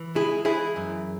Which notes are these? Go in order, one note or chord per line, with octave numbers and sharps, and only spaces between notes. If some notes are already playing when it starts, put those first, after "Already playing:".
Already playing: E3
G#3 E4 G#4
E3 E4 G#4
F#2